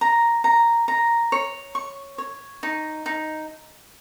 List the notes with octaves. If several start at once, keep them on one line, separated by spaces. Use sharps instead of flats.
A#5
A#5
A#5
C#5
C#6
C#5
D#4
D#4